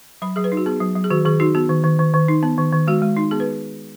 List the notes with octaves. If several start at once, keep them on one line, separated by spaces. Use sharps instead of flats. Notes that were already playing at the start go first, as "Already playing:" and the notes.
F#3 B5
F#3 G#4
B4
D#4
F#4
B3 G#4
F#3
F#3
G#4
D#3 F#4
D#3 G#4
D#4 F#4
B3 F#4
D#3
D#3
D#3
D#3
D#4
B3
D#3
D#3
G#3 F#4
G#3
D#4
B3 G#4
B4